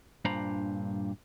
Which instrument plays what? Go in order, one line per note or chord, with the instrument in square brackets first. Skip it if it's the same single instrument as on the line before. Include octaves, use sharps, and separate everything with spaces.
[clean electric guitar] G2 A#2 D4 C5 A#5 B5